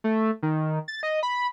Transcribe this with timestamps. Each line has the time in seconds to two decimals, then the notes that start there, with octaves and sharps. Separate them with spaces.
0.04 A3
0.43 D#3
0.88 A6
1.03 D#5
1.23 B5